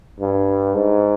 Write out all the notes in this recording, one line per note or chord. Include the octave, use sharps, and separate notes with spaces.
G2
G#2